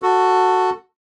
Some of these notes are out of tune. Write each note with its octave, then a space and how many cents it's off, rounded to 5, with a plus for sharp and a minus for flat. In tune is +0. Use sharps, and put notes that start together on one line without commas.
F#4 +0 A4 +15